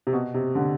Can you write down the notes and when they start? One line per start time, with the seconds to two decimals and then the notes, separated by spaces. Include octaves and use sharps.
0.07 C3
0.13 B2
0.34 C3
0.55 D3